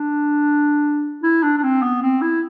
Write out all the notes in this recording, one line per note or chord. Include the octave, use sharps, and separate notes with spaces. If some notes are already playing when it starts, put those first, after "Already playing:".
Already playing: D4
E4
D4
D4
C4
B3
C4
E4